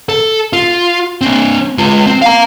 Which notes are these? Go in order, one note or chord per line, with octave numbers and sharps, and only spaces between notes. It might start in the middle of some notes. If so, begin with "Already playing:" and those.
A4
F4
C4 D4
G#3 F4
C4
F5 A#5